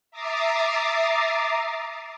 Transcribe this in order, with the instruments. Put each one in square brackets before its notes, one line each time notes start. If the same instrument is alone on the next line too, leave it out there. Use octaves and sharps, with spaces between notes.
[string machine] E5 A#5 D6 D#6 A6 C7